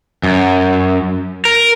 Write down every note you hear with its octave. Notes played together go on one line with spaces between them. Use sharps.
F#2
A#4